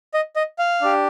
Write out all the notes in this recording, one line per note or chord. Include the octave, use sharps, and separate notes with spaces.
D#5
D#5
F5
D4 G4